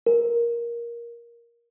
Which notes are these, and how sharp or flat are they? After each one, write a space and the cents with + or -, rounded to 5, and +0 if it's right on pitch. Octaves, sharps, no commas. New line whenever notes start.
A#4 +15